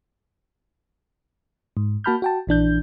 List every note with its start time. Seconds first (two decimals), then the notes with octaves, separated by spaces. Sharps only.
1.77 G#2
2.04 A#3 F#4 A5 B5 F6 G6
2.22 F#4 G5 A5
2.47 A#1 E3 D4 G6